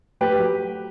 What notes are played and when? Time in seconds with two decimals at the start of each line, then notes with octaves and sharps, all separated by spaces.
0.21 A3 G4 B4
0.37 F#3